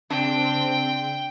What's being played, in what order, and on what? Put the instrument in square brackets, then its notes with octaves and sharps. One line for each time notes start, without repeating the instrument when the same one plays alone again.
[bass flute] C#3 [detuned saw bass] C4 [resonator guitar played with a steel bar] D4 [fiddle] G5